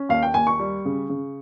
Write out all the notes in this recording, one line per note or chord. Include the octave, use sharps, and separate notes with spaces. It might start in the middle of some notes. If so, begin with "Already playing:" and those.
Already playing: C#4
D#2 F5
G5
D#2 G#5
C#6
G3
C#3
C#3